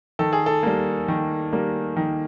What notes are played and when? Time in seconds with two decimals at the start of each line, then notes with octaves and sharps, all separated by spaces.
0.19 D#3 A4
0.33 G#4
0.46 A4
0.63 G3 A#3
1.08 D#3
1.53 G3 A#3
1.97 D#3